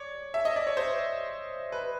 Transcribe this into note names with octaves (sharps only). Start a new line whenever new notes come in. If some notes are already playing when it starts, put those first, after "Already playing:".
Already playing: C#5 D5
E5
D#5
D5
C#5
C5
B4